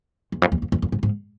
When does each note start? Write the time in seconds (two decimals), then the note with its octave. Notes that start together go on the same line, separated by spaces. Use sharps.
0.32 E2
0.42 F2
0.52 E2
0.62 F2
0.72 F2
0.82 F2
0.92 G#2
1.03 G#2